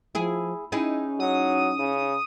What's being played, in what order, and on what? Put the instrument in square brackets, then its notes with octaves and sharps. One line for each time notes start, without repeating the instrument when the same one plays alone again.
[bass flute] F3 [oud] E4 G#4
[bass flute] C#4 [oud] D#4 E4 G#4
[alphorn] F#3 [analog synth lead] D#6
[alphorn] C#3